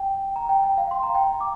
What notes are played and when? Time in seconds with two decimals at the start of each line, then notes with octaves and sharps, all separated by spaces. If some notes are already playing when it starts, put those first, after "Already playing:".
Already playing: G5
0.36 A#5
0.49 G5
0.64 G5
0.78 F5
0.91 C6
1.03 A#5
1.15 G5
1.26 A#5
1.40 D6